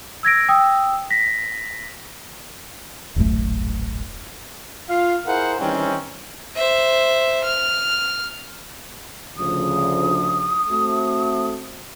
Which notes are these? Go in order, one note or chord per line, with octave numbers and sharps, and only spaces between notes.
E6 G#6 A#6 D7
G5 D#6 E6
A#6 B6
D#1 A1 F#2 A3
F4 F5
E4 G#4 A#4 C5 F5 F#5
D#3 E3 G3 C4 C#4
C5 E5
F6
D2 C#3 F3 D#6
A3 C4 F#4